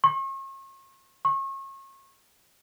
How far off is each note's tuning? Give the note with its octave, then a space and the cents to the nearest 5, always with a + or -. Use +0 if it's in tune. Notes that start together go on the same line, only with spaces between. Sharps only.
C#6 -40
C#6 -35